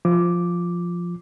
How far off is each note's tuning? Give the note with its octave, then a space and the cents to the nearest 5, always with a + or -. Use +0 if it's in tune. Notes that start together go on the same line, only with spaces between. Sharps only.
F3 +0 D6 +0